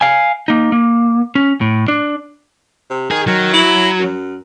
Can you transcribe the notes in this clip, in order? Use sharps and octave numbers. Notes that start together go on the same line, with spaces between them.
F5 G#5
A#3 D#4
A#3
C#4
A2
D4
C3
D#3 G#4
D#3 F#3
E4
F#2